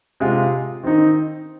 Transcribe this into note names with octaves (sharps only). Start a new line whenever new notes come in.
C3 G#3 F4
D#3 C4 D#4